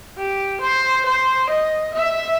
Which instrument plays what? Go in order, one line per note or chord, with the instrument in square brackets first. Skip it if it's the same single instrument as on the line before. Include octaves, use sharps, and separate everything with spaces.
[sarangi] G4
C5
C5
D#5
E5